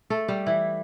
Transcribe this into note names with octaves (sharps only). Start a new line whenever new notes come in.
A3 A4
G3 G4
E3 E4